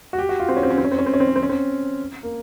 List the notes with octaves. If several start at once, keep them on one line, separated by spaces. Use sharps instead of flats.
F#4
G4
F#4
F4
C4
C#4
C4
C#4
C4
C#4
C4
C#4
C4
C#4
C4
C#4
C4
C#4
C4
A#3